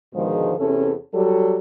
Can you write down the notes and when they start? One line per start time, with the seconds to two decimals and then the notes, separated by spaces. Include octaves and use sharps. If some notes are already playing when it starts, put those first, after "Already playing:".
0.14 G#2 B2 D3 D#3 F3 G#3
0.58 E2 C3 C#4 A4
1.14 F#3 G3 A4